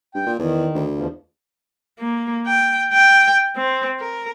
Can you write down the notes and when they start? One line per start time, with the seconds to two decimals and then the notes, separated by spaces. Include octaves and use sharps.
0.15 G2 G5
0.27 A#2
0.39 E2 D#3
0.75 D2
0.94 E2 B2 F3
2.00 A#3
2.47 G5
2.92 G5
3.56 C4
4.00 A#4